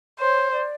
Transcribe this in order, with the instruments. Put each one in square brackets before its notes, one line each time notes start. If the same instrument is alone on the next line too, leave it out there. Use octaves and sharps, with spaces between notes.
[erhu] C5 [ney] C#5
[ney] D5